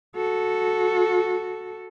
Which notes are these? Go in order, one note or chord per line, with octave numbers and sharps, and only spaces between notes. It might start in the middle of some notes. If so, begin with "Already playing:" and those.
F#4 A4